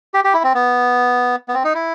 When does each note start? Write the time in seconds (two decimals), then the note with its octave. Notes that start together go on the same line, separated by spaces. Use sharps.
0.14 G4
0.24 G4
0.34 E4
0.44 C4
0.54 B3
1.48 B3
1.54 C4
1.64 D#4
1.75 E4